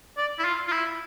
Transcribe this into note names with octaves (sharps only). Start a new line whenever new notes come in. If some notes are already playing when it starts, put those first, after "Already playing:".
D5
E4
F4
F4
E4